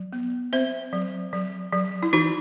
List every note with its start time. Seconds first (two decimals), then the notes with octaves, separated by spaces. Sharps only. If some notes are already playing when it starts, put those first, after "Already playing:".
Already playing: F#3
0.13 B3
0.53 C4 C5 E5
0.93 F#3
1.33 F#3
1.73 F#3
2.03 E4
2.13 E3 D#4 F#4